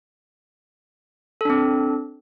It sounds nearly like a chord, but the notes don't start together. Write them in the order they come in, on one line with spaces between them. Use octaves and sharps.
A4 D4 C4